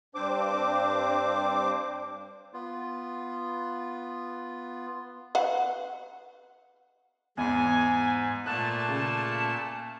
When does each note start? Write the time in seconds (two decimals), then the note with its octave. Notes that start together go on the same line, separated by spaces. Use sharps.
0.15 G2 C4 D4 C5 D6
2.54 B3 F4
5.35 B4 F5 F#5
7.37 E2 G#2 G#5
8.46 A#2 A3 A5 F#6
8.88 C#3